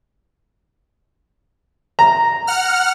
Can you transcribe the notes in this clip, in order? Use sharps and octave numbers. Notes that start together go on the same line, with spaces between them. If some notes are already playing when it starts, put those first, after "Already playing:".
A#5
F#5 F6